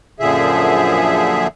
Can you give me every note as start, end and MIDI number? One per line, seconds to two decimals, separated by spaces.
0.20 1.47 42
0.20 1.47 46
0.20 1.47 50
0.20 1.47 53
0.20 1.47 68
0.20 1.47 76